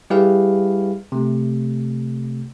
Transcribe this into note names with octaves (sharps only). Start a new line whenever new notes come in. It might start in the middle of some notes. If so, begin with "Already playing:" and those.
G3 E4 G4 G#4 B4 F5
C3 A3